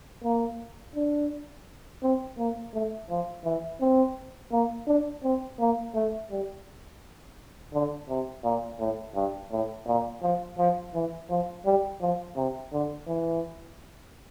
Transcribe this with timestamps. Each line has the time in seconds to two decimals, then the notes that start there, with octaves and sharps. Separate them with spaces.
0.24 A#3
0.95 D4
2.02 C4
2.38 A#3
2.74 A3
3.10 F3
3.45 E3
3.81 C4
4.52 A#3
4.87 D4
5.23 C4
5.60 A#3
5.95 A3
6.31 G3
7.73 D3
8.09 C3
8.44 A#2
8.79 A2
9.15 G2
9.51 A2
9.87 A#2
10.22 F3
10.58 F3
10.94 E3
11.29 F3
11.65 G3
12.01 F3
12.36 C3
12.73 D3
13.08 E3